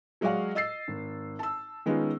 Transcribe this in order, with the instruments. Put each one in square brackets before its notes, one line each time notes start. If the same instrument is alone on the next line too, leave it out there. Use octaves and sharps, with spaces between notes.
[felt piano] F#3 G#3 F#4 D5 F5 F#5
D#5 E6 A6 C7
G#1
A5 E6
D#3 G#3 B3 C#4 D#4 F4